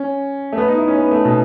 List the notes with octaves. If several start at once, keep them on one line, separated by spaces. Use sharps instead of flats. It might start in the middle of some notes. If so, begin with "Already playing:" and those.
Already playing: C#4
A3
B3
D#4
E4
C#4
B3
A3
B2